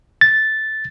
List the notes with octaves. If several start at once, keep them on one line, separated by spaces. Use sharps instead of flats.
A6